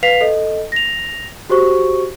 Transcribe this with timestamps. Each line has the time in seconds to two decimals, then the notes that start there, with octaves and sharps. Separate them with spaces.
0.03 B4 F5 B6 C7 F7
0.21 A4 D#5
0.72 A#6 F7
1.50 F#4 G4 C5 C#6